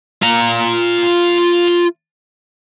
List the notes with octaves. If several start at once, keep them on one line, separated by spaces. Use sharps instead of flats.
F4 A#5